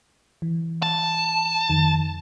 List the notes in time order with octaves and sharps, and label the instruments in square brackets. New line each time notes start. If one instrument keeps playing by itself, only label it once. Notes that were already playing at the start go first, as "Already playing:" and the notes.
[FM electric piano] E3
[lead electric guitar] A5
[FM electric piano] F2 D#3